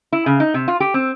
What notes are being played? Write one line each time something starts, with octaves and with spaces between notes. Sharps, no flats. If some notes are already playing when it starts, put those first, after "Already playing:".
E4
C#3
D#4
C3
F4
G4
C4